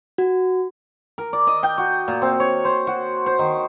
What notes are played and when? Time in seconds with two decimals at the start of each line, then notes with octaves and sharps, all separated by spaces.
0.18 F#4
1.18 A#4
1.33 D5
1.47 D#5
1.63 G5
1.78 F#4
2.08 A#2
2.22 C4
2.40 C#5
2.65 C5
2.87 F#4
3.26 C5
3.39 D#3